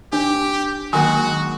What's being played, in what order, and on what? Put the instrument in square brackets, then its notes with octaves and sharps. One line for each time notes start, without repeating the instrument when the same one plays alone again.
[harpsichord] C4 [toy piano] D4 [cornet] G4
[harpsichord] D#3 G#3 A#4 [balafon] F#3 A#3 [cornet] F#4 [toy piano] G#5